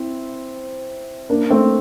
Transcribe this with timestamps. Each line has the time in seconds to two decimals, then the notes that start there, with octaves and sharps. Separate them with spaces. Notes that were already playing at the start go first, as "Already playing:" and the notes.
Already playing: C4 E4
1.30 A#3 D4
1.50 A3 C4